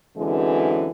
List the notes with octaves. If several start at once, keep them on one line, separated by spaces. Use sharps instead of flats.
F#2 D3 E3 G#3 C4